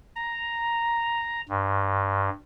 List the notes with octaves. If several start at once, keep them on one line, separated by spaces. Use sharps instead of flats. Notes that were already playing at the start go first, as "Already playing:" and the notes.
A#5
G2